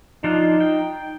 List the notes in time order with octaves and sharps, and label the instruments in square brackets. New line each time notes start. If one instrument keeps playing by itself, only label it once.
[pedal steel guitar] F3 D4 F4 [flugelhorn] D#4
[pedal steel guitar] G5